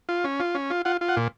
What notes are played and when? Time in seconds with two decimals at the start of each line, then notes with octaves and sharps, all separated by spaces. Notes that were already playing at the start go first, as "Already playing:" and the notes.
0.09 F4
0.24 C#4
0.40 F4
0.55 C#4
0.70 F4
0.85 F4 F#5
1.01 F4
1.09 F#5
1.17 A#2